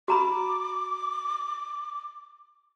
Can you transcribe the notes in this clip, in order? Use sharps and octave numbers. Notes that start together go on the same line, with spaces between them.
F#4 A#5 B5 D6